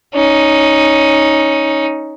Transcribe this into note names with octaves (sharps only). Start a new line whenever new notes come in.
C#4 D#4